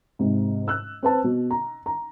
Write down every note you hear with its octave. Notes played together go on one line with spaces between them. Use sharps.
G#2 C3
E6 F#6
C4 B4 A5
B2
A#5
A#5